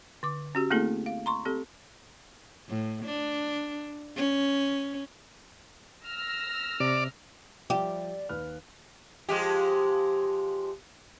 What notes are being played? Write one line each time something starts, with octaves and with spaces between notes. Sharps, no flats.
D3 D6
C#4 F#4 G4
A3 A#3 C4 E4 G#4 A4
F5
A#5 C6 C#6
C4 G4 A4
A2
D4
C#4
E6 F6 A#6
C3 D5
F3 G3 G4 D5 E5
D#2 B4 F6
F3 G#3 G4